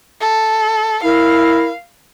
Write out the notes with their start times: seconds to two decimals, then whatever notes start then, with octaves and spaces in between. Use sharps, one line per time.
0.20 A4
1.04 E4 A#4 F5